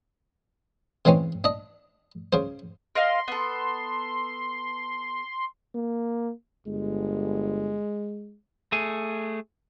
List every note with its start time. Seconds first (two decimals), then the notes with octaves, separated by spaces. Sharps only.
1.05 C#3 E3 G#3 C4 C#4
1.44 D4 D#5
2.33 C#3 C5
2.95 A#4 D#5 F5 C6
3.28 B3 A4
5.75 A#3
6.67 G1 G#3
8.72 A3 G#4